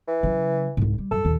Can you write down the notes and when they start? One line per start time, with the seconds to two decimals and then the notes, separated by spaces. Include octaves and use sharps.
0.08 E3
0.23 C#3 F#3
0.77 C2 G#2
0.98 G3
1.11 F#2 A4
1.25 D#2 A#2